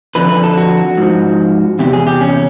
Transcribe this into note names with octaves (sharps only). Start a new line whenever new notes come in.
F2 D3 F3 B4
B4
A4
F#4
G#2 F3
E2 C3 G4
G#4
G4
C#4